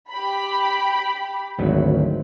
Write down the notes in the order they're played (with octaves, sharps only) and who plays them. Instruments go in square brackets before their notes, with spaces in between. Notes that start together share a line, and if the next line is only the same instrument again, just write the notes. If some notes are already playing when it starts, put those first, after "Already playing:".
[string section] G4 B5
[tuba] G#1 [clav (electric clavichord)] D2 F#3